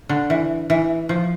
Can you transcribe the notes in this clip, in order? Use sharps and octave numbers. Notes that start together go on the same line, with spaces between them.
D3
E3
E3
F3